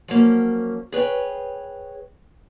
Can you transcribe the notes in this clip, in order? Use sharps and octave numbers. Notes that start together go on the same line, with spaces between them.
F3 F#3 A#3 C#4
G#4 B4 C#5 G5